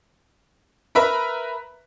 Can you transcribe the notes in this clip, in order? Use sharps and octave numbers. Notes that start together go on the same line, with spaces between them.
A#4 B4 E5 A#5